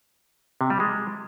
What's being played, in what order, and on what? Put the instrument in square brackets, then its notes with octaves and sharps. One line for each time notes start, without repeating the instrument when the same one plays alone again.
[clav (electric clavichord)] C3
G3
G#3